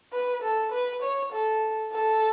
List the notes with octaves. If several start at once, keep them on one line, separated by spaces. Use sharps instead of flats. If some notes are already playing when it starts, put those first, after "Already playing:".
B4
A4
B4
C#5
A4
A4